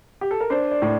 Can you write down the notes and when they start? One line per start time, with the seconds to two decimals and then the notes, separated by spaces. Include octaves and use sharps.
0.21 G4
0.31 A4
0.40 A#4
0.50 D4 C5
0.71 D5
0.82 A2